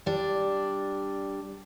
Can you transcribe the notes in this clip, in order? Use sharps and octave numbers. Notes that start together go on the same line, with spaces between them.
G3 D4